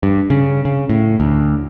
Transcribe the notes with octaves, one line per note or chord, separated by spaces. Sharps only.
G2
C#3
C#3
A2
D2